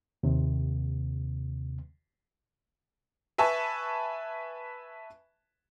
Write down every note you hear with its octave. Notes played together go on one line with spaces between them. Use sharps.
D#2 C3
B4 E5 G#5 A5 C#6